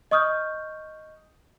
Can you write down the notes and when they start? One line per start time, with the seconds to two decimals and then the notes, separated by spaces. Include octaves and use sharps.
0.11 D#5 C#6 D#6 F6 G6